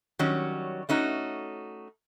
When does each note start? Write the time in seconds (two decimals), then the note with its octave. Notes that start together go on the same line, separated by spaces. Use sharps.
0.19 D#3 F#3 G3 C#4
0.89 A3 C#4 D#4 F#4